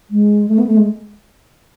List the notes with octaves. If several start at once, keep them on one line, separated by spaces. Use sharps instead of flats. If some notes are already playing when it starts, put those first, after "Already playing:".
G#3
A3
B3
A3
G#3